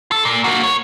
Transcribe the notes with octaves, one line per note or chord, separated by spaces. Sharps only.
A4
A#2
A#3 F#4
C#5